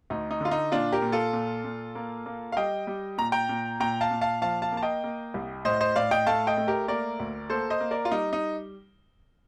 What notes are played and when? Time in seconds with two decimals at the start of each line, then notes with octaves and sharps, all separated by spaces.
0.10 D2 D#4
0.31 D#4
0.41 D3 F4
0.51 D#4
0.72 A#2 D4 F4
0.93 G4 A#4
1.02 A#2
1.12 F4 A4
1.33 A#2
1.64 A#2
1.95 A#3
2.26 A#3
2.52 F5
2.57 G3 D#5 G5
2.87 G3
3.18 A#2 A#5
3.32 G5 A#5
3.49 A#2
3.80 A#2 G5 A#5
4.01 F5 A5
4.11 A#2
4.21 F5 A5
4.42 F3 F5 A5
4.62 F5 A5
4.72 A#3
4.77 A5
4.83 D#5 G5
5.04 A#3
5.34 C2
5.65 A2 C5 D#5
5.81 C5 D#5
5.96 A2 D5 F5
6.11 D#5 G5
6.27 A3 F5 A5
6.47 D#5 G5
6.57 A3
6.68 G4 A#4
6.88 A#3 A#4 D5
7.20 D2
7.50 A#3 A4 C5
7.70 C5 D#5
7.80 A#3
7.91 A#4 D5
8.05 F4
8.11 G3 D#4
8.33 D#4